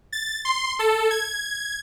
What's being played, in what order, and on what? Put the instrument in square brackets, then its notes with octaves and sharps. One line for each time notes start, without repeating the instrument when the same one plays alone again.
[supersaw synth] A6
C6
A4
G#6